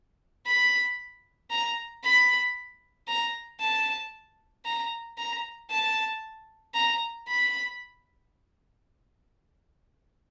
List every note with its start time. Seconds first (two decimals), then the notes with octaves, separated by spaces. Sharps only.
0.46 B5
1.51 A#5
2.04 B5
3.08 A#5
3.60 A5
4.65 A#5
5.18 A#5
5.70 A5
6.75 A#5
7.27 B5